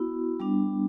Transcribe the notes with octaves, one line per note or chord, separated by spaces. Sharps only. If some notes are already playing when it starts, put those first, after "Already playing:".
Already playing: B3 E4 F#4
G3 B3 D4